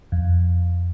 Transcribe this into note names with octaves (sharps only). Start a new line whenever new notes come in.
F2